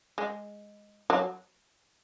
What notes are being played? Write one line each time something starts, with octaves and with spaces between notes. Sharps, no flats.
G#3
F#3